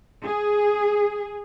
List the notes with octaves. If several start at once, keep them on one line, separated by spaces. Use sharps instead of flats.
G#4